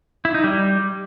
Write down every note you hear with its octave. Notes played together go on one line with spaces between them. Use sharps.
E4
D#4
G3